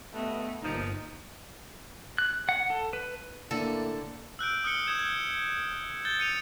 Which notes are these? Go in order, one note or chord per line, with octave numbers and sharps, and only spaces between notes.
G2 A3 B3 B4 D#5
G1 G2 D3 F3 A#3 D#4
F#6
F#5
A4
B4
A2 D3 A#3 A4
E6 F#6 G6 D7
D#6 F6 F#6 C#7 G7
D#6 G6 G#6 E7
G6 A6 G7
C#7 D#7 F7